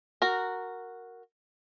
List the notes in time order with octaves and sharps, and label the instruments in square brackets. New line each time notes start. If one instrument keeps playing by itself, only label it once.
[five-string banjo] F#4 A#4